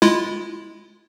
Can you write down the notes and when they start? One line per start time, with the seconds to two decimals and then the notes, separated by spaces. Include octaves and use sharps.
0.02 G#3 E4 F4